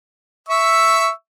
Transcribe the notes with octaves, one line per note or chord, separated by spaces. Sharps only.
E5 C#6 E6